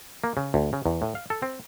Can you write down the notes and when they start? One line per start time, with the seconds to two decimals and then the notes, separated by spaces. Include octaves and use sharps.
0.24 A#3
0.37 C#3
0.54 D2
0.73 C#3
0.86 E2
1.02 A2
1.15 F5
1.30 A4
1.42 C4